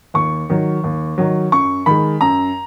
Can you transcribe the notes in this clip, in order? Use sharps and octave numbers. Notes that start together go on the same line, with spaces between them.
D#2 C#6
D#3 F#3
D#2
D#3 F#3
F#2 C#6
D#3 G#3 B5
F#2 A#5